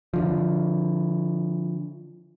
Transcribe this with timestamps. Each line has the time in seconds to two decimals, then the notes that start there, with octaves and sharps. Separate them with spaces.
0.14 D3 F3